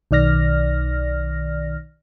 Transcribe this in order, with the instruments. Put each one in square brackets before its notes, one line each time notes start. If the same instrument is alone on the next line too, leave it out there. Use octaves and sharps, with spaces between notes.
[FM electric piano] B1 D#3 D5 F6 A#6